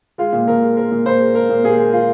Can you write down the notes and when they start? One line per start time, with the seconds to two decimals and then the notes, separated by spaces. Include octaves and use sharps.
0.18 G#3 F4
0.33 A#2
0.48 A#2 A#4
0.62 G#3
0.77 G#3 A#4
0.91 A#2
1.05 A#2 C5
1.21 G#3
1.35 G#3 A#4
1.49 A#2
1.64 A#2 G#4
1.79 G#3
1.93 G#3 F4